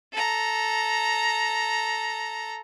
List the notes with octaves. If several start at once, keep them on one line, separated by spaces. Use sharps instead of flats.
A4 A#5